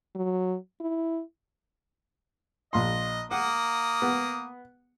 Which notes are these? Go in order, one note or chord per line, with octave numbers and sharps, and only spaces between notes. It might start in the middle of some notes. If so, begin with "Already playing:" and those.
F#3
E4
A#1 D#5 C6
A#3 F#5 D#6
B3